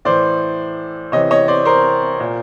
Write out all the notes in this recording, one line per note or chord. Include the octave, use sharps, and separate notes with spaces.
A2 E3 C5 D5
C3 E3 C#5 D#5
C#5 D#5
C5 D5
A#4 C5
A#2